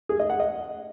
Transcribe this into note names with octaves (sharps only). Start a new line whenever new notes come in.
G#4
D#5
F#5
D#5